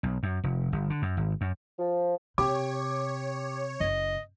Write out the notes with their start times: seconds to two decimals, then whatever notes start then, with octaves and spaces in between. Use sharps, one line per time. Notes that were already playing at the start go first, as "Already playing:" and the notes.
0.03 B1
0.23 F#2
0.44 F1
0.72 G1
0.90 D3
1.02 F#2
1.17 G#1
1.41 F#2
1.78 F3
2.38 C3 G4 C#5 D6
3.80 F#1 D#5